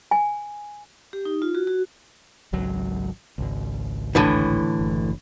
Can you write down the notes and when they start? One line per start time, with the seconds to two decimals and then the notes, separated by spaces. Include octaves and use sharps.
0.11 G#5
1.13 G4
1.25 D#4
1.42 F4
1.55 F#4
1.67 F#4
2.53 G#1 C#2 F#3
3.38 G#1 C#2
4.15 A2 D3 E3
4.79 F#1